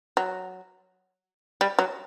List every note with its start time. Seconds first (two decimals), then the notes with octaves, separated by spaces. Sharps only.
0.17 F#3
1.61 G3
1.79 F#3